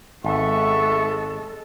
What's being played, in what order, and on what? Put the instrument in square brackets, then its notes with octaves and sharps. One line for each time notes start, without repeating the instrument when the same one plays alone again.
[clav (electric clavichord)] G#1 [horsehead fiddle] G#3 A4 [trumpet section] B3 E5 C#6